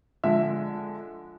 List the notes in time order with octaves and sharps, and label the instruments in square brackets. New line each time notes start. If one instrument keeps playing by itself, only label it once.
[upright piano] D3 F3 G#3 E5